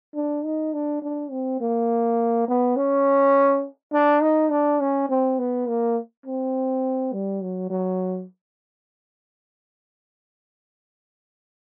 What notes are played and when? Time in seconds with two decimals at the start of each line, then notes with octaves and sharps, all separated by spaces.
0.15 D4
0.44 D#4
0.73 D4
1.02 D4
1.31 C4
1.61 A#3
2.48 B3
2.76 C#4
3.92 D4
4.22 D#4
4.50 D4
4.81 C#4
5.09 C4
5.39 B3
5.67 A#3
6.26 C4
7.13 G3
7.42 F#3
7.70 F#3